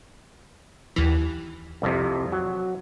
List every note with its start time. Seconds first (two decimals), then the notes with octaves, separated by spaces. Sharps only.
0.96 D#2 E3
1.82 C2 F2 C3
2.32 F#3